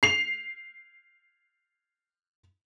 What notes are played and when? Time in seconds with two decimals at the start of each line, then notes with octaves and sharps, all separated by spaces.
0.03 C7 F7